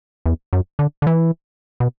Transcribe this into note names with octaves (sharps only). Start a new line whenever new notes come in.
E2
F#2
D3
D3
E3
B2